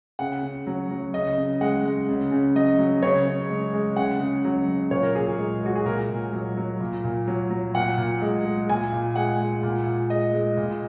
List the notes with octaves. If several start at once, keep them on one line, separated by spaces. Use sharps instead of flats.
C#3 F#5
C#3
F#3
F#3
C#3 D#5
C#3
G#3 F#5
G#3
C#3
C#3
F#3 D#5
F#3
C#3 C#5
C#3
G#3
G#3
C#3 F#5
C#3
F#3
F#3
A#2 C#5
A#4
A#2 G#4
G#4
G#3
G#3 F#4
G#4
A#2 A#4
A#2
F#3
F#3
A#2
A#2
F#3
F#3
A#2 F#5
A#2
G#3
G#3
A#2 G#5
A#2
G#3 F#5
G#3
A#2
A#2
G#3 D#5
G#3
A#2